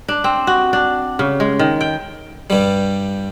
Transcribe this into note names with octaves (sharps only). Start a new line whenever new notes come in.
D4
C4
F#4
D4
C#3
G#3
D#3
G5
G2 G3